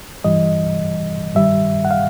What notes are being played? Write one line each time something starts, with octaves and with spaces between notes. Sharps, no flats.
G2 E3 G3 D#5
G2 D#3 G3 E5
F#5
F5